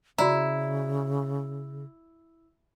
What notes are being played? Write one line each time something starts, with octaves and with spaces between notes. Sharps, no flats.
C#3 E4 F#4 D5 A#5